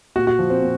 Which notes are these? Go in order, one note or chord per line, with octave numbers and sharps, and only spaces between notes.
A#2 F#4
F#4
F3
C4
A#2